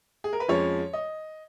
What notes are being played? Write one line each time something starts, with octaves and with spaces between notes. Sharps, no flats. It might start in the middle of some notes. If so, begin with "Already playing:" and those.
G#4
A#4
B4
F2 F3 G#3 C#4 C#5
D#5